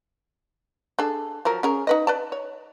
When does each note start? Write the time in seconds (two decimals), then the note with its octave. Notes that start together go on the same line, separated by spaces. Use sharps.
0.99 D4 G#4 A4
1.45 F3 F#3 A#4
1.63 C#4 G#4 A#4
1.87 D#4 B4 D#5
2.07 B4 D5 A5
2.32 C#5